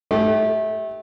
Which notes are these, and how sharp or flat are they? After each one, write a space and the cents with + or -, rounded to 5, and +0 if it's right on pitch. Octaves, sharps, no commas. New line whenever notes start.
A3 -25 G4 -5